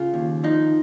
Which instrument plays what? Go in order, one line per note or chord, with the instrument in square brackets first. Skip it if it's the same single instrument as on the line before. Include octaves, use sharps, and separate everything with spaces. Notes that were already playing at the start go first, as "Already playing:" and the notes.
Already playing: [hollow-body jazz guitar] C#3 F4
D#2
F3 D#4